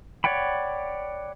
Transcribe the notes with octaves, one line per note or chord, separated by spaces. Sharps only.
C#5 D5 F#5 G5 B5